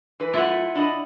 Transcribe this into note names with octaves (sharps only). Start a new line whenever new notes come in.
E3 B4
F#2 A3 E4 F4 F#5
D4 D#5 B5